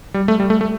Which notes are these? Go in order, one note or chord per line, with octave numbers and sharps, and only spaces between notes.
G3
A3
G3
A3
A3